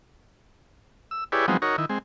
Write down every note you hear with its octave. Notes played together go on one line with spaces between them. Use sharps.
E6
E4 G4 G#4 B4 C#5 D5
F3 F#3 G#3 B3 C4 D#4
D#4 F#4 A#4 C#5
D#3 E4
G#3 C4